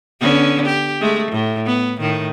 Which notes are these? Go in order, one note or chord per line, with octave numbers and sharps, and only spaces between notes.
D3 B3 C#4
G4
G#3 A3
A2
B3
A2 D#3